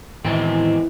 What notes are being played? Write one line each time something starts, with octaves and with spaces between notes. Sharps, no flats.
E2 A2 D#3 E3 G#3 C4